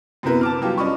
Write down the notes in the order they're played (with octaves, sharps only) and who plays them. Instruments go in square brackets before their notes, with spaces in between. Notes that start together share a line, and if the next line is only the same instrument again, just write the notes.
[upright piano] F#2 C3 B3 E4 A#4 B4
A5 D6 F6
F#3 G3 F4 G4
C#4 D5 D#5 B5 C#6